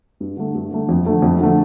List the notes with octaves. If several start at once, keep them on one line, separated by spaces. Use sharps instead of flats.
G2
D3 A3
G2
D3 A3
F2
D3 A3
F2
D3 A3